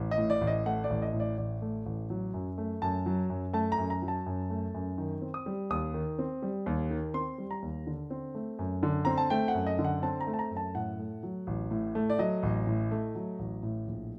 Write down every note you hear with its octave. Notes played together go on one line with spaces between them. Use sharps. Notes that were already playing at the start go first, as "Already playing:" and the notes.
Already playing: A1
D#5
A2
D5
A1
D#5
A3 F#5
D5
A1
D#5
A2
D5
A1 D5
A3
A1
F#3
F#2
A3
F#2 A5
F#3
F#2
A3 A5
A#5
F#2
A#5
F#3
A5
F#2
A3
F#2
D#3
C4
D#6
G3
D#2 D#6
D#3
C4
G3
D#2
D#3
C4 C6
G3
A#5
D#2
D3
C4
A3
F#2
D3
C4 A#5
A5
A3 G5
F#5
F#2
D#5
D3
F#5
C4 A5
A#5
A3
A5
A#5
F#2
A5
A2 F#5
A3
F#3
A1
A2
A3
D5
F#3 D#5
A1
A2
A3
F#3
A1
A2
A#1